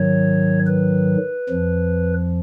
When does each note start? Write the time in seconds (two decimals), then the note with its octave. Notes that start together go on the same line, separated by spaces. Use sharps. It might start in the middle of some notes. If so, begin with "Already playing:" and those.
Already playing: G#2 D#3 F#3 C#5
0.67 B4
1.49 F2 F3